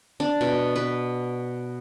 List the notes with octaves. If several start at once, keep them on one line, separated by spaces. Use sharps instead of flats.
D4
B2
B4